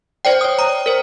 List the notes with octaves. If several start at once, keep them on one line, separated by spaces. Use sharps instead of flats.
C5 D5 G5
C#5 D#6
A#5
A#4 C5